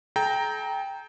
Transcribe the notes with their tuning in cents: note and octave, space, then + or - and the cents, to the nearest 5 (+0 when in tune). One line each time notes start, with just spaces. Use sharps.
A4 -45 G5 +0 A#5 +0